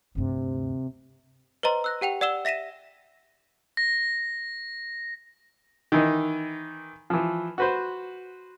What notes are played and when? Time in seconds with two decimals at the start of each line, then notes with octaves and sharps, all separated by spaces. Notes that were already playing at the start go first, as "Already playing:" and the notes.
0.15 D2 G2 C3
1.63 B4 C5 D#5 A#5 C6
1.84 E6 F#6 A#6
2.01 G4 F#5 G5 F7
2.21 D5 F#5 E6 E7 G7
2.45 E5 A#6 B6 D#7 E7
3.77 A#6
5.92 D#3 E3 D#4
7.10 E3 F3
7.58 F#4 B4 C5